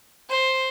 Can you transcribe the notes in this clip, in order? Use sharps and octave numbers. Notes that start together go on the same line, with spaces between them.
C5